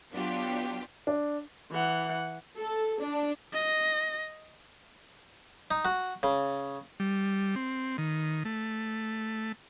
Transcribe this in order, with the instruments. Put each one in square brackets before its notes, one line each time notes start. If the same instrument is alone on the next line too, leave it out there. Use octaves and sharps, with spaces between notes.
[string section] F#3 B3 D4 F4 G4
[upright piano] D4
[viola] E3 F#5
[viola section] A4
D4
[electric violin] D#5 A#6
[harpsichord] D#4
F#4
C#3
[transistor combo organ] G3
C4
D#3
A3